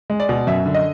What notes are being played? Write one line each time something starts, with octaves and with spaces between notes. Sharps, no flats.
G#3
D5
B2
F#2 E5
D3
D#5